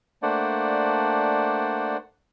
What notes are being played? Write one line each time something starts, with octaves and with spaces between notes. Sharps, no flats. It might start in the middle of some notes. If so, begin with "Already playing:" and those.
A3 A#3 D4 C5 D5 F#5